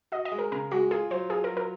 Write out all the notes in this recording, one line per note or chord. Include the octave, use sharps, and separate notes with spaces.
F#4 D#5
D#5
G#3
A#4
C#3 A#4
G#3 F#4
F4 G#4
F#3 C5
F4 G#4
A#4
F#3
A#4